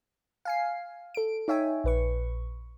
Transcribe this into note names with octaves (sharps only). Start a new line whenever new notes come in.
F5 G#5 C7
A4 D7
D#4 C#5 E5 G5 G#5
A#1 B4 C#6